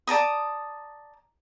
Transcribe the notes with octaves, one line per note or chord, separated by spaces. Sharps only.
D5 A5 A#5 D#6